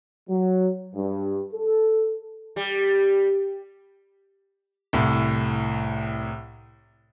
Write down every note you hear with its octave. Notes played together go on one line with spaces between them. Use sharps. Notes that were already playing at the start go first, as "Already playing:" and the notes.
F#3
G2
A4
G3
C2 A2